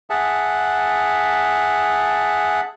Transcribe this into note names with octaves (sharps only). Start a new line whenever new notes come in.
G#4 E5 F#5 A5